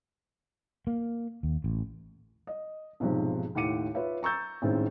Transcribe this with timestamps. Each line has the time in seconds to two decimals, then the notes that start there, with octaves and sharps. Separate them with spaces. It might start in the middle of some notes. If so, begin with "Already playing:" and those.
0.87 A#3
1.43 D#2
1.64 A1
2.47 D#5
3.00 B1 G#2 C3 F3
3.55 D#2 A2 F#5 D6 C#7 D#7
3.95 F4 B4 C#5 E5
4.23 A#5 C#6 E6 G6 A6
4.62 A1 D#3 G#3 C4